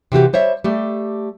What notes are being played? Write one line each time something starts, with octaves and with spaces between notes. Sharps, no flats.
C3 E3 F#4 G4
G3 C5 C#5 E5
G3 A3 G4